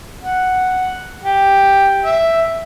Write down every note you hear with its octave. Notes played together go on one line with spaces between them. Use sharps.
F#5
G4
E5